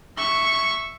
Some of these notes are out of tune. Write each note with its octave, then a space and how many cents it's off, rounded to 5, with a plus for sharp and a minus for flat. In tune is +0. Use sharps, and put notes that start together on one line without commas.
E5 +0 C#6 +0